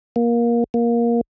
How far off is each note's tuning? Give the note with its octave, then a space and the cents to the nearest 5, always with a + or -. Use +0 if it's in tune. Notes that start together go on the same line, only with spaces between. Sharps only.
A#3 +20
A#3 +15